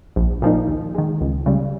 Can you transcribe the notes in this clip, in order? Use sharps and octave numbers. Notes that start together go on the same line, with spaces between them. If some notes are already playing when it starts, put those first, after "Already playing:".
A#1
A#2 F3 A#3 D#4
D#2
D#3 G#3
C#2
C#3 G3